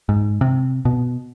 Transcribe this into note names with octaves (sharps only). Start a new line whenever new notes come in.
G#2
C3
B2